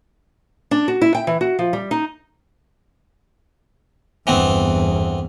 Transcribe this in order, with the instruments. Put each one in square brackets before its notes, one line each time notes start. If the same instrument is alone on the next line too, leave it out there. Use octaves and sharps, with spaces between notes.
[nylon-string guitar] D4
F#4
E4
G5
E3
F#4
F3
G3
D#4
[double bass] G1 E2 [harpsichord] E3 B3 C4